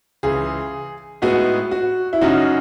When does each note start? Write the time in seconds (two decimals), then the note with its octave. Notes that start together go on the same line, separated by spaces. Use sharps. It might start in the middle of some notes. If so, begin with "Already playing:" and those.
0.23 C#2 C#3 E3 G#4
1.22 A2 G#3 B3 D#4 F#4 G#4
1.71 F#4
2.13 E4
2.21 F#2 C#3 F#3 C#4 D#4 F#4